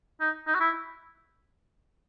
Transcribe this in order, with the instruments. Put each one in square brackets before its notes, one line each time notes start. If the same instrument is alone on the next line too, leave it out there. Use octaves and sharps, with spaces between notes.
[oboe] D#4
D#4
F#4
E4